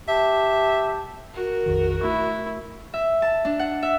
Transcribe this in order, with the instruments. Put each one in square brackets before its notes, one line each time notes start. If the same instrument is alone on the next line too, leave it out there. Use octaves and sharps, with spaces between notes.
[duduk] G4 [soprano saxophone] E5 [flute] A5
[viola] F#4 A#4
[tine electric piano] A#1 F2 D#3
[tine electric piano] A3 C#6 [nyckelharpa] E4
[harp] E5
A5
D4
F#5
E5